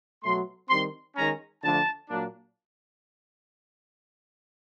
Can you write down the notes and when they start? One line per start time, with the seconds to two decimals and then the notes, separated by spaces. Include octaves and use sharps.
0.23 B2 F#3 A3 C6
0.69 D#3 G3 C4 C6
1.16 D#3 G#3 C#4 A#5
1.63 D3 F3 A3 D4 A5
2.09 A#2 F#3 A#3 D4